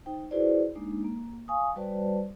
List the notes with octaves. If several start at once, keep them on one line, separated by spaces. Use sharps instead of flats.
D#4 C5 G5
E4 F#4 G#4 B4 C5 D5
G#3 A#3 D4 D#4
A#3
F5 G#5 C#6 D#6
G3 F#4 B4 C5 D5 A5